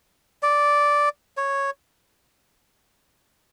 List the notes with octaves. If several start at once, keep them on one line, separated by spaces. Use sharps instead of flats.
D5
C#5